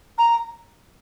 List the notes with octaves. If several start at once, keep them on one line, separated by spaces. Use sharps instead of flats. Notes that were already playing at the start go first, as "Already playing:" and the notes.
A#5